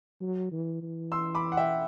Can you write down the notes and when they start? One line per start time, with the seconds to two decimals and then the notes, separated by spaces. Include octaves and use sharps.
0.21 F#3
0.52 E3
0.82 E3
1.12 C6 E6
1.35 B5 D6
1.52 F#5
1.57 E5 G5